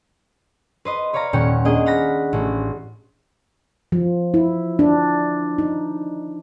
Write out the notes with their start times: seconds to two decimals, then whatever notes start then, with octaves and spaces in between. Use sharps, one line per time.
0.85 B4 C5 D#5
1.13 B4 C#5 D5 F5 A#5
1.33 D#1 A#2 C#4 F#5 G5 C#7
1.65 A#3 B3 D4 G#4 D#5
1.86 F5 F#5 B5 A#6
2.33 A1
3.92 F3
4.34 E4
4.79 D4
5.58 D#4